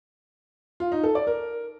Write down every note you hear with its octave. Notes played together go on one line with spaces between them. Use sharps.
F4
D#4
A4
D5
A#4